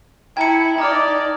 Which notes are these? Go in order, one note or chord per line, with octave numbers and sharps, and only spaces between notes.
E4 G5 A5 A#5 G#6 C#7
D#4 D5 A#5 D6 F6